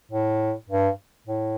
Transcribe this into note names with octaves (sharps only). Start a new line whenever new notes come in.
A2
G2
A2